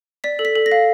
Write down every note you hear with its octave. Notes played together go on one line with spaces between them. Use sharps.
D5 B6
A4
B6
A4
A#6
F5